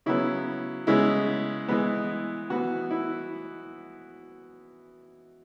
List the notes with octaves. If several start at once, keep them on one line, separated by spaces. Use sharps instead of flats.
C#3 F#3 B3 E4
C#3 G#3 B3 E4
E3 G#3 B3
E3 B3 F#4
E4